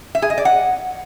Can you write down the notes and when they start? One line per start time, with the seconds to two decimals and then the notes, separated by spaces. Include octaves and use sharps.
0.15 E5
0.22 G#4
0.30 D#5
0.38 D5
0.45 F#5